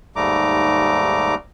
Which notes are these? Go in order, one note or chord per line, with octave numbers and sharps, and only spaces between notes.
D#2 G#2 G3 A3 A#5 D6